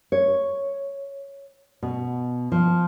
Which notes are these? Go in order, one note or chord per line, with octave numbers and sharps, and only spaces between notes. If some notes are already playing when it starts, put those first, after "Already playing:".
C#5
B2
F3